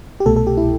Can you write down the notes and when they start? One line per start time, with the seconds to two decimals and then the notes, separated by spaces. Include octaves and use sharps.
0.20 G4
0.26 C2 B2 A3 A4
0.36 A4
0.47 G4
0.57 E4